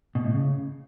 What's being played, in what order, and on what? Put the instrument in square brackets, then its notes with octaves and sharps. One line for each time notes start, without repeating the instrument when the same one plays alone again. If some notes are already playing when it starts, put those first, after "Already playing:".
[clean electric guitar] B2
A2
C#3